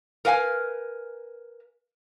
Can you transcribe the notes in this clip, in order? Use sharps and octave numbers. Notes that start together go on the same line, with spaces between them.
A#4 B4 F5 G5 G#5